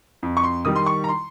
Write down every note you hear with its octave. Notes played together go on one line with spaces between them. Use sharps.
F2
C#6
C6
D#3 G3 D#6
C6
C#6
A#5
C6